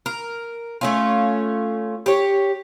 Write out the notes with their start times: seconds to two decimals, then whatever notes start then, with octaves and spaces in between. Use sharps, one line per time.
0.06 A#4
0.81 A3 C#4 F4
2.06 G4 C#5